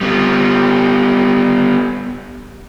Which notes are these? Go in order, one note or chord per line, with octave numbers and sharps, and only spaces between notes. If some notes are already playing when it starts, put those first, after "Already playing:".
G3 B3